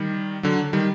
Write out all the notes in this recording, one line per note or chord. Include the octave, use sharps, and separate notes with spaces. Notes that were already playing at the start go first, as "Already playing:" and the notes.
Already playing: D#3 G3
D3 F#3
D#3 G3